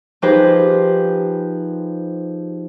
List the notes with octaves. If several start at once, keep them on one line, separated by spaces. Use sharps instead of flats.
F3 D#4 G4 G#4 B4 C5